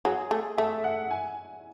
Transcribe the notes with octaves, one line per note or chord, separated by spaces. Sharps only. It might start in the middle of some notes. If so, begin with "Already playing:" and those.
F#3 G#4
A3
A3 E5
F#5
G#5